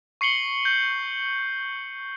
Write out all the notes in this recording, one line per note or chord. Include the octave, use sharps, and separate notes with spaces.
C#6 C7 C#7 F#7 G7
G6